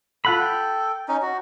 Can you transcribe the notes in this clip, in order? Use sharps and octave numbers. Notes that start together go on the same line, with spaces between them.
F4 A4 F#5 B5
G5
C#4 D#4
F#4